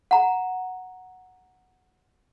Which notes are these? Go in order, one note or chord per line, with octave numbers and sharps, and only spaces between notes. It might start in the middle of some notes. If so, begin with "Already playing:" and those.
F#5 A#5